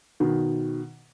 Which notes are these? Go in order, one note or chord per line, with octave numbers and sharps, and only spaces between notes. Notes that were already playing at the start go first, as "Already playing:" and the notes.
B2 D#3